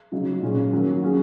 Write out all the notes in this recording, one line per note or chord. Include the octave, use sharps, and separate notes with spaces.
C#3 F#3 D#4
A#2 F#3 C#4 G#4
D#3 F#3 A#3 C#4
F#3 C#4 G#4